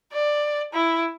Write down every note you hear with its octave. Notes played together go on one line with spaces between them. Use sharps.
D5
E4